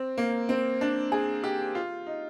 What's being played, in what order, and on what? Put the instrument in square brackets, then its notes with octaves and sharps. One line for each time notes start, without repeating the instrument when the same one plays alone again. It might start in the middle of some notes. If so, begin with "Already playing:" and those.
Already playing: [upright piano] C4
A#3
C4
D4
G#4
G4
F4
D#4